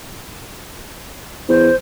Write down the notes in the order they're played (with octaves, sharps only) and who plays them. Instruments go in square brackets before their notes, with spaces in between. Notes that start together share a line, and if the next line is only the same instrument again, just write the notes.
[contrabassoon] E2 [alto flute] C5